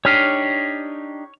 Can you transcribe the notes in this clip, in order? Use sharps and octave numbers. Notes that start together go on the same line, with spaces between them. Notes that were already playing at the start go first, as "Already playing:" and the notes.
D4 D#4 G4 C#5 F6